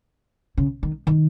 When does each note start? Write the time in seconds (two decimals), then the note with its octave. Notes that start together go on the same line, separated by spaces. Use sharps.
0.57 C#3
0.83 D#3
1.07 D#3